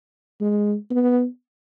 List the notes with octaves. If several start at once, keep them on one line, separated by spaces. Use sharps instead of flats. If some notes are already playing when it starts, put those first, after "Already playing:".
G#3
B3